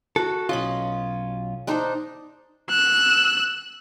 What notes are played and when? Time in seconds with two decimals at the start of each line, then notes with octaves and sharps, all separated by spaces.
0.16 F#4 A4
0.49 B1 C#4 F4 D#5 B5
1.67 D4 D#4 C5
2.70 E6 F#6